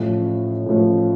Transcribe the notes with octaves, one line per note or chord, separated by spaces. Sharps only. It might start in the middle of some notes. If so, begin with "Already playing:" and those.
Already playing: A1 A2 F3
A1 A2 F3